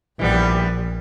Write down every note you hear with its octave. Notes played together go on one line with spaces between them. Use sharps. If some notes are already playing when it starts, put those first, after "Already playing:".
A#1 E3 G3 B3